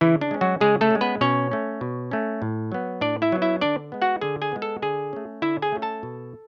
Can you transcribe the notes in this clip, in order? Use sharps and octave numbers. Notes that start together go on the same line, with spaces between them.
C#3 E3 E4
D4
G#3 C#4
F#3 F#4
C#3 G#3 G#4
A3 A4
G#3 C#4
B3 B4
B2 C#4 C#5
A3 C#4
B2
A3 C#4
A2
F#3 B3
A2 D4 D5
E4 E5
F#3 B3
E4 E5
D3 D4 D5
G#3 B3
F#4 F#5
D3 G#4 G#5
G#4 G#5
G#3 B3
A4 A5
D3 G#4 G#5
A3 C#4
D3 E4 E5
G#4 G#5
A3 C#4
A4 A5
B2